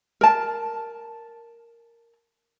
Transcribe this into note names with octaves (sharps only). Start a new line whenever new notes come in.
A#4 A5